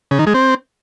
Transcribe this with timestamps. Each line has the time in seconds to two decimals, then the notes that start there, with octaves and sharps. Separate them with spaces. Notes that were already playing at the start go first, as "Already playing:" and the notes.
0.11 C#3
0.19 D#3
0.27 G#3
0.34 C4